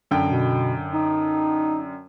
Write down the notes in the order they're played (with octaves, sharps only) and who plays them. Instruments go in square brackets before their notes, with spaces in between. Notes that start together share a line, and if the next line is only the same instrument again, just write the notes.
[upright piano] F#2 D3 G5
[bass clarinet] B2
D#4